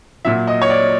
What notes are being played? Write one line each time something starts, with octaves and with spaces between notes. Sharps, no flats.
A#2 F#3 E5
D#5
C#5
D5